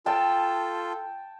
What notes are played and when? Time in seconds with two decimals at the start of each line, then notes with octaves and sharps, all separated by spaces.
0.06 F4 A4 G5 A5